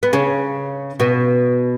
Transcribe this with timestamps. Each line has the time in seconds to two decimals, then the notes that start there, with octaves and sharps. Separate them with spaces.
0.03 B3
0.13 C#3 C#4
1.00 B2 B3